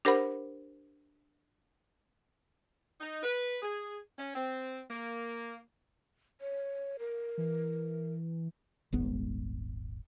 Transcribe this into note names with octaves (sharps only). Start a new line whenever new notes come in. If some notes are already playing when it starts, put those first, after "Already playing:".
D4 G4 A#4 C5 F#5 B5
D#4
B4
G#4
C#4
C4
A#3
C#5
A#4
E3
D#1 G#1 G#2 B3